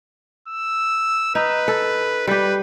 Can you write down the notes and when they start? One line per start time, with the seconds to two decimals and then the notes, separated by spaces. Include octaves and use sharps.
0.48 E6
1.35 D#4 B4
1.68 A4
2.27 G3 G4 B4